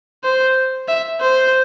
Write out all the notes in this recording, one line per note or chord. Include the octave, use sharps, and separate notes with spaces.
C5
E5
C5